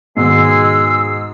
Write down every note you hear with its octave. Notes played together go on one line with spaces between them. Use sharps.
G#2 B2 D#3 G#3 E6 C7